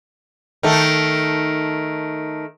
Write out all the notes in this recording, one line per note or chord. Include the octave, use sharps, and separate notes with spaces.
D#3 A3